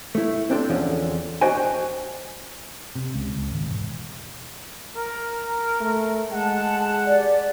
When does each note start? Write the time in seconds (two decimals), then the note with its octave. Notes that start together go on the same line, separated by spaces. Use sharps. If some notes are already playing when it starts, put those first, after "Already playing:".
0.15 A3 E4
0.50 C4 D4 A4 C5
0.69 E2 D3 F3 C#4
1.41 D4 F#4 C5 D#5 G5 G#5
2.96 C3
3.14 C#2
3.37 C#2
3.51 G#1
3.66 E1
4.96 A#4
5.81 A3
6.32 G#3 F#5 A5
7.05 G4 D5